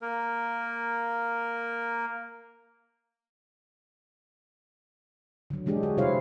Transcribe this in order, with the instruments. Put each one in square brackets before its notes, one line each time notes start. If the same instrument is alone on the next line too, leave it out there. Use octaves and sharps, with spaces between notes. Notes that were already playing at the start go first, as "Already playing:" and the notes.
[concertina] A#3 A#4
[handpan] D3 F#3
E3 G#3 D4 G4 G#4
F#4
C3 G3 E4 C5 C#5 F5